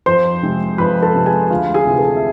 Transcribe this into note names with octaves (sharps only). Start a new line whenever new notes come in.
F2 C5 C6
C3 G#3 C4
F2 B4 B5
A4 A5
C3 G#3 C4
G#4 G#5
D2 F4 F5
G#4 G#5
C3 E3
A4 A5
E5